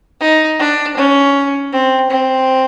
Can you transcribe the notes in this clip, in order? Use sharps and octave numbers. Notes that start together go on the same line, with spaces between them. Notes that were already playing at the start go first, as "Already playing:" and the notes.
D#4
D4
C#4
C4
C4